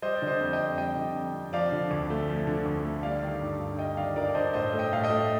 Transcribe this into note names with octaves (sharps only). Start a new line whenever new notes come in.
G3 C5 D#5
D5
D3
C5 D#5
F2
D#5 G5
F2
G3 D#5 G5
D3
F2
F2
F3 D5 F5
D3
D2
A3
F3
D3
D2
A3
G3 D5 F5
D#3
G2
G2
G3 D#5 G5
D#3 D5 F5
G2 A#4 D5
D5
G2 C5 D#5
A2 C5 D#5
A3
D#5 G5
A2 F5
D#5 G5
A3